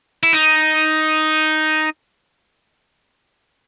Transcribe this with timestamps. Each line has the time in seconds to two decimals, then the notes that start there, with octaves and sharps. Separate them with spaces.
0.23 E4
0.33 D#4